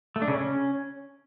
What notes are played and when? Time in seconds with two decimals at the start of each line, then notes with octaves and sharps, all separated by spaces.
0.16 A3
0.22 D4
0.28 C#3
0.34 C#4